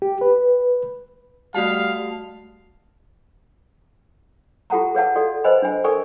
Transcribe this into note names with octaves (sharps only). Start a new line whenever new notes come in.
G4
B4
G3 A3 F#4 F5 A5
F4 G4 A4 F#5 A5 A#5
G#4 B4 C#5 F5 F#5 A5
F#4 A4 D5
B4 C5 D#5 G#5 B5
D4 G#5
A4 A#4 D5 G#5 C#6